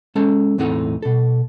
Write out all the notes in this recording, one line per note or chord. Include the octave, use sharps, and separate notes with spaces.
G#3 C#4 A4 A5
E2 A2 C4 D#4 A4 F#5
B2 A4